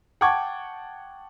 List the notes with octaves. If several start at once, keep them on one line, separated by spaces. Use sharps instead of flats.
F#5 G5 A5 C#6 D6 G#6